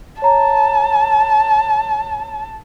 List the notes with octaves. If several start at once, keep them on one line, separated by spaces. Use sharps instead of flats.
C#5 A5 A#5